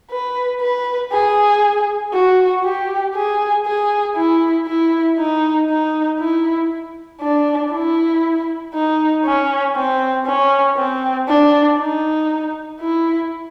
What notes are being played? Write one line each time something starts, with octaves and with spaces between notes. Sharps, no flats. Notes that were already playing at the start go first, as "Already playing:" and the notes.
B4
B4
G#4
F#4
G4
G#4
G#4
E4
E4
D#4
D#4
E4
D4
E4
D#4
C#4
C4
C#4
C4
D4
D#4
E4